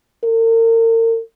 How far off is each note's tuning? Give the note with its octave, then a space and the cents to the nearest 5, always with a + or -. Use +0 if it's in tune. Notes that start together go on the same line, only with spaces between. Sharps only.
A#4 -40